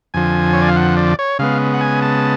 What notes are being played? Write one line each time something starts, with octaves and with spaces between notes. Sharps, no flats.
F2 D3 F3 G#5
C#5
D5
F5
F#5
D5
C#5
C#3 G#3 B3 F5
F#5
G#5
A5